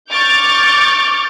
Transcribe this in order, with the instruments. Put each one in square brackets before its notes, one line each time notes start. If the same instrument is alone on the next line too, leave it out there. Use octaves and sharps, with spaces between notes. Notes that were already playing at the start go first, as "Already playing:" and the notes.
[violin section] C#6 D6 F6 G6 A6